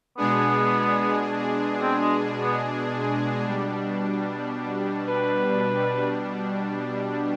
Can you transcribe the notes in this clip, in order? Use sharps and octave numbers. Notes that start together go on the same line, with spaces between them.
B2 G#3 B3 D4 G#4
C4
G#3
B3
B2 G3 D4
B4